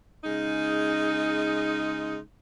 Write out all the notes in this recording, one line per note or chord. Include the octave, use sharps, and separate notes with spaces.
C#3 G#3 D#4